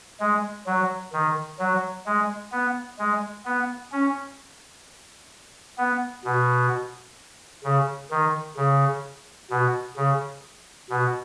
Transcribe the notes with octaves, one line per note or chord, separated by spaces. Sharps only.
G#3
F#3
D#3
F#3
G#3
B3
G#3
B3
C#4
B3
B2
C#3
D#3
C#3
B2
C#3
B2